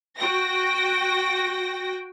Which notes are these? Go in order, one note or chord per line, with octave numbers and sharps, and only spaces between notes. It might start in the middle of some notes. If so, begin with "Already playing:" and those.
F#4 G5 A#6